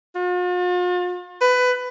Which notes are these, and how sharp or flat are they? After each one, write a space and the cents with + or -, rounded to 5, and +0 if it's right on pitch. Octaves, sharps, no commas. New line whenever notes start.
F4 +45
B4 +20